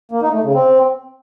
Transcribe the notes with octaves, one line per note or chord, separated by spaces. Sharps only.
A#3
D#4
A3
C#3
C4